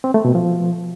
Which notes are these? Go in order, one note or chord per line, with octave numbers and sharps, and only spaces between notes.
C4
A3
B2
F3